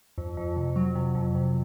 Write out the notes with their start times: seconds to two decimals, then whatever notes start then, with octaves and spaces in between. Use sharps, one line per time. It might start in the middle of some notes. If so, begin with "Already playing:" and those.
0.18 F2
0.37 F2
0.57 C3
0.76 F#3
0.95 C3
1.15 F2
1.35 C3